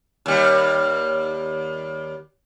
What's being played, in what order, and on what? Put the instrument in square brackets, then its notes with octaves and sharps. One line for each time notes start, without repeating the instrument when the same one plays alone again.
[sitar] D#2 G3